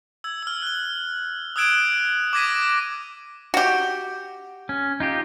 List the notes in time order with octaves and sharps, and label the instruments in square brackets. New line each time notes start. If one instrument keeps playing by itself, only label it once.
[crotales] E6 G#6
E6 F6
F#6 G7
D#6 E6 F#6 G#6 D7 E7
D6 D#6 G#6 A#6 B6 D#7
[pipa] F#4 G4
[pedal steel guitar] C#4
D#4 F4 G4